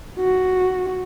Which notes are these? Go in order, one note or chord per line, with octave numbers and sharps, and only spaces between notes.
F#4